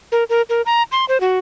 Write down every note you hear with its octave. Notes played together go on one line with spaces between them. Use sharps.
A#4
A#4
A#4
A#5
C6
C5
F#4